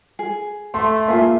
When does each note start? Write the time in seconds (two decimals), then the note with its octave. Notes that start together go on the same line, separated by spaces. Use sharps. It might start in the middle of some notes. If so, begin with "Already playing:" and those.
0.19 G#4
0.74 A3 C6
1.08 A#3 F4 G#4 E5